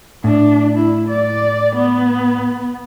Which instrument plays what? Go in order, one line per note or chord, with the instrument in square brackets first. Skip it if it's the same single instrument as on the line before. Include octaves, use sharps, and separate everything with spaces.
[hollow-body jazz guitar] A2 [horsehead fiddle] D4
[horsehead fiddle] E4
D5
B3